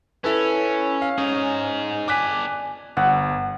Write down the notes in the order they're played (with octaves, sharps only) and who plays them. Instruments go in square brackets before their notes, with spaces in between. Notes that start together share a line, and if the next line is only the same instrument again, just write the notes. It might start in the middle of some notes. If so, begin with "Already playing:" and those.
[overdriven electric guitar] C#4 [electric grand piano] E4 A4 B4
[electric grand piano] F5
[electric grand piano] C#4 [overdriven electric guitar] D#4 G#4
[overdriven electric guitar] D4 G#5 [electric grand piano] D6 F#6 B6
[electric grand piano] G1 [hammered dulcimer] F#5